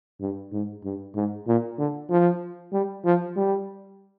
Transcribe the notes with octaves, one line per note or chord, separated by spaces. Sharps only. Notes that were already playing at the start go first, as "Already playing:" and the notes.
G2
G#2
G2
G#2
A#2
D3
F3
G3
F3
G3